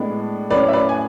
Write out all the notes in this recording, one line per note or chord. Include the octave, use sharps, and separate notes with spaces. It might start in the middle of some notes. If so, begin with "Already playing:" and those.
Already playing: A2 G#3 B3 D4
A2 F#3 C#4 B4 D5
E5
B4 D5
G#5